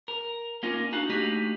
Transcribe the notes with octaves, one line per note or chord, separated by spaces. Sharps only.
A#4
A#3 C#4 D#4 F4 A#4
D4 D#4 F#4 F5
A3 A#3 D4 D#4 F#4 G4